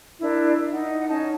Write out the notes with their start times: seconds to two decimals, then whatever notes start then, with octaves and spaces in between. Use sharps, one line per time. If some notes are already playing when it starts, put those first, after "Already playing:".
0.21 D4 E4 A#4
0.72 D#4 F#5
1.09 C#4 D#4 A5